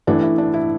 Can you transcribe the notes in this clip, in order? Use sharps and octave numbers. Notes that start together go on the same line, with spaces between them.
A1 A2 E3 A3 D4
E4
D4
E4